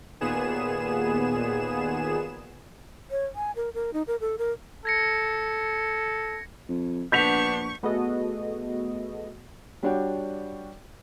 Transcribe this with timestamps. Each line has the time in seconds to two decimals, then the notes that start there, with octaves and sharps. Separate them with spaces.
0.20 D#2 A#2 B3 G#4 E7
3.11 C#5
3.35 G#5
3.56 A#4
3.74 A#4
3.93 D#4
4.07 A#4
4.21 A4
4.38 A#4
4.85 A4 G#6 A#6 C#7
6.68 F2
7.12 A#1 B3 D4 C#6 G6 B6 F7
7.83 A3 B3 F#4 G#4 A4 D#5
9.83 G3 D4 F#4 C#5 F#5 G5